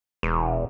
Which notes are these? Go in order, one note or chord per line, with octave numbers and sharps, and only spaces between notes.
E1